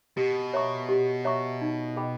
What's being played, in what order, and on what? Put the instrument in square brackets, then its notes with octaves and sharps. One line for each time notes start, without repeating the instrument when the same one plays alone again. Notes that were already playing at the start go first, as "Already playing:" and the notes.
[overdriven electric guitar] B2 [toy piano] G4
[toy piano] C#5 E5 A#5 C#6
G4
C#5 E5 A#5 C#6
D#4
G#4 D#5 G5 B5